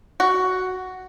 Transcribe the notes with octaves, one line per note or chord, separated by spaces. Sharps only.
F#4